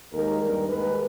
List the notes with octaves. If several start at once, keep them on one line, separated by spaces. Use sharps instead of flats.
D#2 D#3 G#3 A#4
G2 D#3 G3 A#4
D#2 D#3 G#3 B4